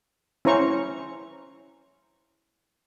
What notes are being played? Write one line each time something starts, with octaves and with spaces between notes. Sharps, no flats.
C#4 E4 C5 A#5 C#6